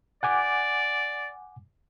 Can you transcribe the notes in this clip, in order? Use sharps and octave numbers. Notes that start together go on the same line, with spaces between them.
D5 F#5 G#5 D6